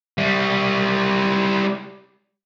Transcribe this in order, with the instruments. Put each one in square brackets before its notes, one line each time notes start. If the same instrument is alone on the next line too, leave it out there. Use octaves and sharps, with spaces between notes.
[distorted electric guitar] G3 E4